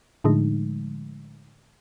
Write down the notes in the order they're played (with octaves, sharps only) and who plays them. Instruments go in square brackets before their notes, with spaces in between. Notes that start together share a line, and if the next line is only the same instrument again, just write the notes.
[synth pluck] A2 D3 F3 G#3 A3 D#4